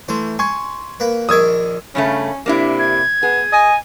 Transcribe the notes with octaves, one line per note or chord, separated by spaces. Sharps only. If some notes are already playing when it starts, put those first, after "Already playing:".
E3 A3 C5
G#5 C6 C#6 G#6
A#3 B4
A#1 D#3 A#4 D#6 E6 G#6
G2 C#3 A3 C#4
C3 A#3 D4 E4
G#6
B3 G#4
D#5 G#5